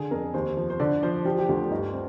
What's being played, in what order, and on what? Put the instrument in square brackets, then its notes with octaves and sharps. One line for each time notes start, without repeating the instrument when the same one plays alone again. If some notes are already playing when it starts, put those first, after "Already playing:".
Already playing: [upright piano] D3 G#4
F2 A#4
D#2 C5
F3
C5
D3 D5
F3 C5
F3 G4
G4
D2 F4
G2 D#4
C4